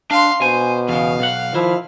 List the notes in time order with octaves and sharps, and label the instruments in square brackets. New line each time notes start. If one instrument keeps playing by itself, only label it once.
[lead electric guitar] D4 [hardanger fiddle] F5 C6
[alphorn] B2 [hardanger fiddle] C5 [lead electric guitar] G#5
[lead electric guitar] E2 C#3 [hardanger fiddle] F5
[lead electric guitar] B1 F#5
[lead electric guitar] D#3 E4 [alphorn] F3